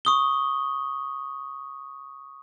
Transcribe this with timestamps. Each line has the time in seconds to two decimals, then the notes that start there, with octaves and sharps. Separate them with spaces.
0.05 C#6 D#6 G7